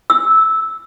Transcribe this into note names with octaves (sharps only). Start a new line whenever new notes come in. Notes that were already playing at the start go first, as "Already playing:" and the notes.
E6